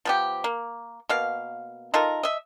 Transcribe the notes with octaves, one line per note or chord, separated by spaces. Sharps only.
F3 B3 G4
A#3
B2 A#3 F5
D#4 F4 A4 A#4
D#5 E5